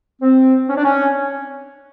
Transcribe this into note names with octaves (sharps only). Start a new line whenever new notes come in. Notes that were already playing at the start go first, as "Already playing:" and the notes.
C4
C#4
D4
C#4